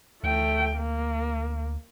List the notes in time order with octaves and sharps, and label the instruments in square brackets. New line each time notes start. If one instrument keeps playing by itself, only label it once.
[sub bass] D2 [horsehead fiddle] A3 G5
[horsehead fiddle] A#3